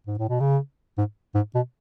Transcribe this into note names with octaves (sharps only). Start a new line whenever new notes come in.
G#2
A2
B2
C#3
G#2
G#2
B2